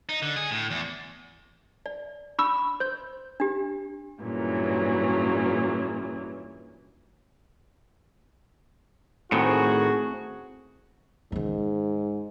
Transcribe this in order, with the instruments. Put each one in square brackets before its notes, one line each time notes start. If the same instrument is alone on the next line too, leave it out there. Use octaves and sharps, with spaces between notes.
[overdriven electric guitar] D#4
D3
G#4
A2
E2
[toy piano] D5
[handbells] D4 C#6 E6 [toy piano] B5
[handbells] C5 G6
[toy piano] D4 G4
[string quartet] G2 A#2 C#3 E3 F#3
[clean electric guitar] A2 D#3 [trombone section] A3 F#4 G#4 [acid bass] C4
[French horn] G#2 [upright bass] D#3 C#4